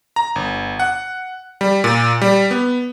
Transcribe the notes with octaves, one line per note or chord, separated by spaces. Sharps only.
A#5
G1
F#5
G3
A#2
G3
B3